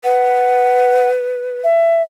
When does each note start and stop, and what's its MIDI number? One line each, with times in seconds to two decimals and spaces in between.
0.04 1.62 71
0.04 1.09 78
1.64 2.02 76